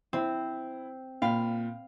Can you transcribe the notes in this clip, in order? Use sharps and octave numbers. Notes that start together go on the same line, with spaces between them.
C4 E4
A#2 F5 G5 B5